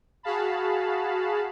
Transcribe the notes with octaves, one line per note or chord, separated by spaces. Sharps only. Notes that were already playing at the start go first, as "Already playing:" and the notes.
F#4 G#4 F5 A5 B5